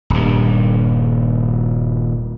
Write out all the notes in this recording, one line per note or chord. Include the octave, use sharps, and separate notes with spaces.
D#1 G2